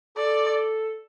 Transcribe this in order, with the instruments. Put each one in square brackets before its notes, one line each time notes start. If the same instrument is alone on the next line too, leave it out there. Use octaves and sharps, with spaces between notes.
[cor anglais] A4 [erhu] D5